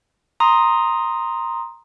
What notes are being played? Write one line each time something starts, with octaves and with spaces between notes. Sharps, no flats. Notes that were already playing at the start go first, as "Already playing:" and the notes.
A#5 C6 D#6